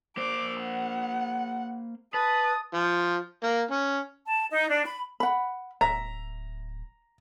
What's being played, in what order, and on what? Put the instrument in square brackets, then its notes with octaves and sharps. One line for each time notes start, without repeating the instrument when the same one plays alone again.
[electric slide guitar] A#3 C5 [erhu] D6
[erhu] F#5
[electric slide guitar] B4 [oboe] A5 [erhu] D#6
[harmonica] F3
A#3
C#4
[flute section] A5
D#4
D4
B5
[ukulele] F#5 B5
[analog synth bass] D1 [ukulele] E5 [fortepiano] A#5